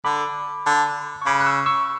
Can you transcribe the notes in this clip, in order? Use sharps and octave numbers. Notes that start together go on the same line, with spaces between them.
D3 B5 D6
D3
C#6
C#3 B5 D6
F#6
C#6 E6
C#6 E6